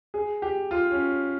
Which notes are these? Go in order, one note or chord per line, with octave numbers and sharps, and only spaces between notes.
G#4
G4
F4
C#4